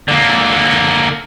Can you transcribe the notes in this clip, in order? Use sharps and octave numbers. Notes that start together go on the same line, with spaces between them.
D3 A#3